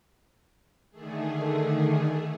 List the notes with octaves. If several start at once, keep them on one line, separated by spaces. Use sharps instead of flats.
D3 D#3 A3 G#4